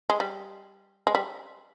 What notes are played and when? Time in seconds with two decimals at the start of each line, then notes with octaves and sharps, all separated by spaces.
0.10 G#3
0.20 G3
1.07 G#3
1.15 G3